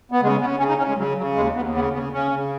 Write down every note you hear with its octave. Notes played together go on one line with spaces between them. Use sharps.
B3
C#3 G#3
C#3 B3
C#3 C#4
D#4
C#3 C#4
G#3
C#3 F#3
C#3 F#3
D#2 G#3
D#2 B3
C#3 B3
C#3 B3
C#3 C#4
C#3